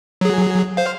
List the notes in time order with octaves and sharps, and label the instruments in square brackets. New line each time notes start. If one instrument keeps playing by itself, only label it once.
[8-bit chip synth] F#3 G#4
C5 F5